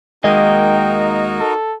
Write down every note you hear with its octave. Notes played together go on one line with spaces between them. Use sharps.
D#2 G#3 A#3 D#4 F#4 A#4 D#5 G5
A4